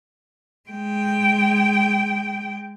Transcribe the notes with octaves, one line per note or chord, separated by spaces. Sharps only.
G#3 G5